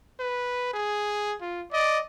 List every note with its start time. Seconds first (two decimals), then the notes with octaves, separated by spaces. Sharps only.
0.20 B4
0.73 G#4
1.41 F4
1.73 D5 D#5